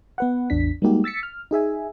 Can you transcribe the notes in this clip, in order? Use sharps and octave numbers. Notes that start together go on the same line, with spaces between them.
B3 B4 F#5
A1 E2 D4 B6
G3 G#3 A#3 D#4 F#4 G4
E6 A6 B6 C#7
F6
D#4 G#4 E5 G#5